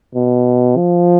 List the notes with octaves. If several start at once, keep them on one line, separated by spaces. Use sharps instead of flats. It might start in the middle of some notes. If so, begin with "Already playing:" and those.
B2
F3